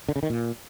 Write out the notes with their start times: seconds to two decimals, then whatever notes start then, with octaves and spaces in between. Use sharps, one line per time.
0.09 D3
0.16 C#3
0.23 D#3
0.30 A#2